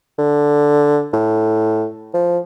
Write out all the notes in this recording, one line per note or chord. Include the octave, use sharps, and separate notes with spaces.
D3
A2
F3